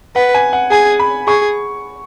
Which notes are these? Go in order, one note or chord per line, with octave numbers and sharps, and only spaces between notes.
B4 F#5
G#5
F#5
G#4 G#5
B5
G#4 C#6